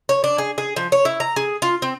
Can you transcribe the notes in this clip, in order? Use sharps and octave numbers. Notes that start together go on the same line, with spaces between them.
C#5
D4
G#4
G#4
F3
C#5
E4
A#5
G#4
F4
C4